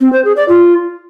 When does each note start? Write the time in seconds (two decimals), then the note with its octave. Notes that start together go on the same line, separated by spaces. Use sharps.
0.01 C4
0.13 C5
0.25 G#4
0.37 D5
0.49 F4